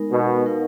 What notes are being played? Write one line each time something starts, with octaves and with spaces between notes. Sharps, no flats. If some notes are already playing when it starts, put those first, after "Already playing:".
Already playing: G#3 B3 D#4 A#4
B2
D#4 A#4 F5